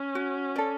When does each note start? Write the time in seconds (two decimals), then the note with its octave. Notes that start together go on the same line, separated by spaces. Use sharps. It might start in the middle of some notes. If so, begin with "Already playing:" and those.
Already playing: C#4
0.15 F#4
0.56 A4 D5